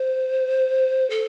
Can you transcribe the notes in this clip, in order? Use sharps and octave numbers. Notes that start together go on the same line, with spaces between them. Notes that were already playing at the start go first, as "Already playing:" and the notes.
Already playing: C5
A4